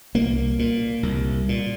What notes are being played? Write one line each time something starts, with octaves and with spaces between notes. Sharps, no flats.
C2 A#3
A#2
C2
A#2